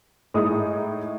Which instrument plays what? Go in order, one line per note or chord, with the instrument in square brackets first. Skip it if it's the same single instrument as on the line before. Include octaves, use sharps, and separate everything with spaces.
[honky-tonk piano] A2 G#3 D#4 G#4 D#6